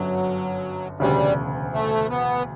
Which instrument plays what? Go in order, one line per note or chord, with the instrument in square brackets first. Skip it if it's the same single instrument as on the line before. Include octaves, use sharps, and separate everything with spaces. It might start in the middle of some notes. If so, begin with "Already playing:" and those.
Already playing: [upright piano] G1 F#2 D3 [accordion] F#3
[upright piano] E1 D2 C#3 [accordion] G3
[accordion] A3
B3